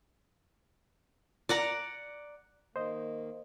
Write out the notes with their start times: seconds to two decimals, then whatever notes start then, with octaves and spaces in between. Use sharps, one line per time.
1.49 D5 F#5 A#5
2.76 D#3 A#3 C5 D#5